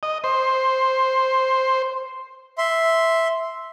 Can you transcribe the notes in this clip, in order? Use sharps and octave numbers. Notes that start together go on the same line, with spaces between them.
D#5
C5
E5 C6